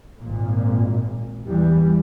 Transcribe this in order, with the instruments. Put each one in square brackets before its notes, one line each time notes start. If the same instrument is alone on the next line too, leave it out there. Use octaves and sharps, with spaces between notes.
[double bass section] G#1 A#2
E2 E3 G3